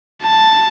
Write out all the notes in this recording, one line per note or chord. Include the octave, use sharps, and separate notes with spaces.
A5